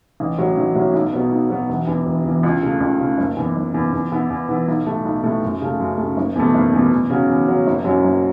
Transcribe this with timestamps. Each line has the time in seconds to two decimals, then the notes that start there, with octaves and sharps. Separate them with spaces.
0.20 A1
0.38 A2 F#3 C#4
0.57 A1
0.75 A2 F#3 C#4
0.94 B1
1.13 B2 F#3 B3
1.32 B1
1.50 B2 F#3 B3
1.69 E1
1.87 E2 E3
2.06 E1
2.25 E2 E3
2.43 C#2
2.62 C#3 A3
2.80 C#2
3.00 C#3 A3
3.18 F#1
3.37 E2 E3
3.56 F#1
3.74 E2 E3
3.93 E2
4.12 E3 B3 E4
4.30 E2
4.49 E3 B3 E4
4.68 B1
4.86 A2 A3
5.05 B1
5.24 A2 A3
5.43 F#2
5.61 C#3 A3
5.79 F#2
5.98 C#3 A3
6.17 F#1
6.35 E2 B2 A3
6.55 F#1
6.73 E2 B2 A3
6.91 E2
7.10 C#3 F#3 C#4
7.29 E2
7.48 C#3 F#3 C#4
7.67 F#1
7.84 F#2 F#3 C#4 E4
8.04 F#1